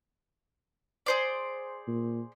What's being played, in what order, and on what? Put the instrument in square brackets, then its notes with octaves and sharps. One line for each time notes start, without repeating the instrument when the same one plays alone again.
[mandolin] G#4 C5 D5
[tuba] A#2